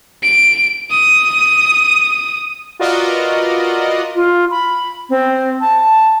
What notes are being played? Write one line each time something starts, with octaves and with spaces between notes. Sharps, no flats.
D7
D#6
F4 F#4 A#4 B4 D5 D#5
F4
B5
C4
A5